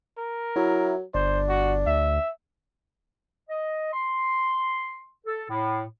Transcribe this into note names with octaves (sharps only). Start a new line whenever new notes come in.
A#4
F#3 E4
G1 D4 C5
F#4
D2 E5
D#5
C6
A4
A2